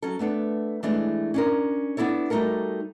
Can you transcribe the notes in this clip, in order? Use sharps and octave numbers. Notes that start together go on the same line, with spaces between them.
F#3 C#4 A4
A3 B3 D4 A4
E3 G#3 A3 D4 G#4
C#4 D4 A#4
B3 D4 E4 A4 C#5
G3 A3 D#4 F#4 A4 A#4